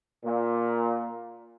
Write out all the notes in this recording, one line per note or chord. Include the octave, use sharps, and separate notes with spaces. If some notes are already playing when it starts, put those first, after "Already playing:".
A#2